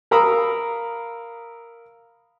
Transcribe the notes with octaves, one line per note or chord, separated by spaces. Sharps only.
A#4 F5 A#5 B5 D#6 E6